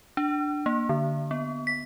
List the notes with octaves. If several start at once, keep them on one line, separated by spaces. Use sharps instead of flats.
D4
A#3
D3
B3
B6